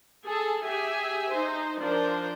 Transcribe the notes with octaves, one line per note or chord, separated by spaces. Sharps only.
G#4 A4 A5
G4 G#4 E5 G#5
D#4 C5
F3 D4 A#4 C5